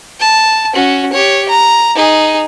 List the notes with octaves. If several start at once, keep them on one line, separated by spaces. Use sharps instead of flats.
A5
C#4 F#4
G4 C#5
A#5
D#4 G#4